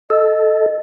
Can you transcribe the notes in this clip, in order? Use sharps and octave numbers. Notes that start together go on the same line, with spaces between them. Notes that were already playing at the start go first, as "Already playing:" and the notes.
A4 D#5